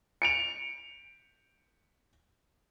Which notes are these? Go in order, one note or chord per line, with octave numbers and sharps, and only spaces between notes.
C#7 D7 F7